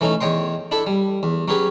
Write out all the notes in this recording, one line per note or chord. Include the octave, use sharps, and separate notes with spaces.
E3 A3 C#4 D#4
E2 C#5 D#5 G5 C6
D4 E4 A4 E5
G3
E2
F#3 C#4 G4 G#4 B4